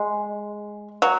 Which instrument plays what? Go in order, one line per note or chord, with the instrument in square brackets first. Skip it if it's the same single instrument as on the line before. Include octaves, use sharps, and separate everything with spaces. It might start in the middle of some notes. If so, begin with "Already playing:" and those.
Already playing: [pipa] G#3
F#3